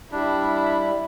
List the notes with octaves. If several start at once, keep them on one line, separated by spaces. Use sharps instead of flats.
G3 D4 E4